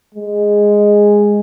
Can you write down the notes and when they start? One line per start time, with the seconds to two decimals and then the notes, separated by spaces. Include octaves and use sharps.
0.15 G#3